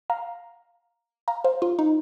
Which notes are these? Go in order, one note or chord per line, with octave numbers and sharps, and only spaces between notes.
F5 A#5
F5 A#5
C5 F5
F4
D#4